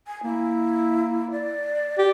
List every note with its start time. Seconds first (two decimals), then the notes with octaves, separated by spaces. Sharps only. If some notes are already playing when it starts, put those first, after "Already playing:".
0.07 G#5
0.24 A#3 E4
1.31 D5
1.99 G4